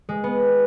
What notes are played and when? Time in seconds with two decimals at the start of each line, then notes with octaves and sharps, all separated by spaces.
0.09 G#3
0.24 B3